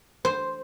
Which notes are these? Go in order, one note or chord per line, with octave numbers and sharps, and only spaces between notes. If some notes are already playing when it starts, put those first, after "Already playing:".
C5